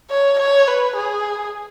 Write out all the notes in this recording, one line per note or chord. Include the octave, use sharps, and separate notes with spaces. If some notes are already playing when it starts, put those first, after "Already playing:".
C#5
C#5
B4
G#4